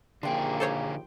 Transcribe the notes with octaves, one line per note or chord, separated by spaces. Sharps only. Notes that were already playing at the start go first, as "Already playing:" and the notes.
A#1 D#2 D3 A#3 G#4 G5 C6
A4 C5 C#5